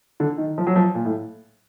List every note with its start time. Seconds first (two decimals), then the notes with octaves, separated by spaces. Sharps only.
0.20 D3
0.38 D#3
0.58 F3
0.67 F#3
0.76 F3
0.95 A#2
1.05 A2